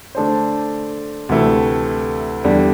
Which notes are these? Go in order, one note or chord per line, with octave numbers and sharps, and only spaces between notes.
D3 A3 D4 A4 C5
D2 C3 E3 A3 E4
E2 D3 G3